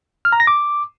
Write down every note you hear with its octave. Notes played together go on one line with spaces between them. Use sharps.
F6
A#5
A#6
D6